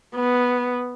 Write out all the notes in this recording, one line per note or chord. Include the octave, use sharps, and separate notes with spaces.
B3